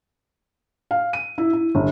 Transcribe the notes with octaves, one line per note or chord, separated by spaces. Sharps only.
F5
D#7
E4
E4
G1